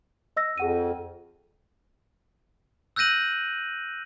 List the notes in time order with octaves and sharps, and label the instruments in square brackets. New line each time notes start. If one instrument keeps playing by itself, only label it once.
[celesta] D#5 E6 A#6
[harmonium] F2 [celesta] G#4 F#5 D#7
[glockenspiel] E6 F#6 G6 A#6 D#7 F#7